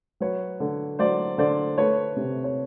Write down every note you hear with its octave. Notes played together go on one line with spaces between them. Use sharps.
F#3 B4 C#5
D3
F#3 C5 D5
D3 C5 D5
A3 B4 C#5
C3
C#5